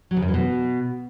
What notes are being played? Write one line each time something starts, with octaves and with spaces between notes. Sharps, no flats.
F#3
C#3
F#2
E3
B2